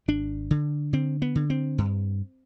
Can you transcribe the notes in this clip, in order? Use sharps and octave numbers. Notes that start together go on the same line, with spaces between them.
G#1 D4
D3
D3 C4
B3
D3
C4
G2